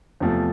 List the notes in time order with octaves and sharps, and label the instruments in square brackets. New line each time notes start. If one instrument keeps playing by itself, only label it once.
[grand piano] E2 C3 F3 A3